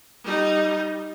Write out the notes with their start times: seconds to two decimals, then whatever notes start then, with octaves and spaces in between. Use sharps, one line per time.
0.24 G3 D#4